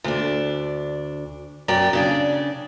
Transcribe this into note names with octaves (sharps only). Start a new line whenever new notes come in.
D2 D4
F#2 F#3 D5 G5
C#3 D4 D5